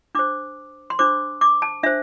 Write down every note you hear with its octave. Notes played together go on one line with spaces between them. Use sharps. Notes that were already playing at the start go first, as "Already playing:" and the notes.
D4 C5 D6
C6
D4 C5 D6
D6
A5
D4 C5 E5